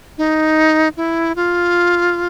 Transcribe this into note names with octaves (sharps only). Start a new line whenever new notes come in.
D#4
E4
F4